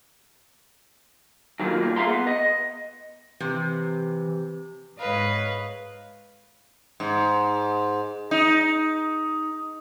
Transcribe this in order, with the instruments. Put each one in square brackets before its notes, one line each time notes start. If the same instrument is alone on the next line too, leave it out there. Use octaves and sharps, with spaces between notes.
[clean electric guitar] D#3 F#3 A3 A#3 F4
G2 A#3
F4 G#4 E5 F5 A#5 C6
B3
D#5
[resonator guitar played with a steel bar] C3 [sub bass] E3
[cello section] G#2 D#5 [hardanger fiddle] B4 C#5 [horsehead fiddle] F5
[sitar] G#2
D#4